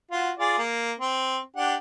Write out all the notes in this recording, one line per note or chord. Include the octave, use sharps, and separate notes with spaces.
F4 F#4
F4 G#4 D5
A#3
C4
D4 G4 F#5